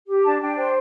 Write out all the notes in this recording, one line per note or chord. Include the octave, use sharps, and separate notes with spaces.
G4
D4 A5
D4 G5
C5 G5